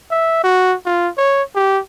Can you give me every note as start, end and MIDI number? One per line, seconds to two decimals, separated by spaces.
0.11 0.41 76
0.44 0.75 66
0.86 1.09 65
1.17 1.42 73
1.55 1.79 67